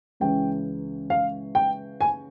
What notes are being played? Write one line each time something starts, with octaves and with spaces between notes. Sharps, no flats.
C#2 C#3 E3 G#3 C#4 G5
F5
G5
G#5